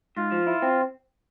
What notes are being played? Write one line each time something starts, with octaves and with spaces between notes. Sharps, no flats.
G#2 F4
F3
E4
C4